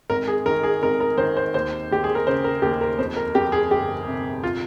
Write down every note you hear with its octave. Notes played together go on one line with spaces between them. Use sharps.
G#1 A#4
G#4
D#3 A#4
G#4
G#1 A#4
A#4
D#3 C5
C5
D#2 C5
D#2 G4
G#4
A#4
C#3 C5
A#4
D#2 G4
A#4
F2 C5
A#4
F2 G4
G#4
G1 G4
C3
F4